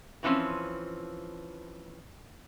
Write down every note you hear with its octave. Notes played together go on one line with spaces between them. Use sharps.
B2 E3 F3 C4 C#4